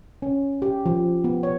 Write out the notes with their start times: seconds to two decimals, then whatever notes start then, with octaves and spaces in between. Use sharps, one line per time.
0.22 C#4
0.62 G4
0.86 F3
1.24 B3
1.43 C#5